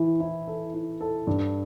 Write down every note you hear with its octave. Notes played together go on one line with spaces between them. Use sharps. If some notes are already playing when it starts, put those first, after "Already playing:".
Already playing: E3 E4
E4
A4
E4
A4
G2